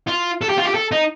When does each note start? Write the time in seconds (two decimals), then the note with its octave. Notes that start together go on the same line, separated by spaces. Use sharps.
0.08 F4
0.41 A4
0.49 G4
0.57 F4
0.65 G4
0.74 A4
0.91 D#4